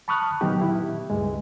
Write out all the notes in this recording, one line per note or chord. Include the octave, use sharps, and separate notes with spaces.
A5 B5 C#6 D#6 F6 F#6
A#2 D#3 F#3 B3 D#4 G4
E4
C#2 G2 G#3